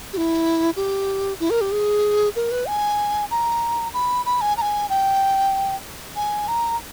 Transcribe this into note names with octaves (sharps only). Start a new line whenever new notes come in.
G4
E4
G4
E4
A#4
G4
G#4
A#4
B4
G#5
A#5
B5
B5
G#5
A#5
G#5
G5
G#5
A#5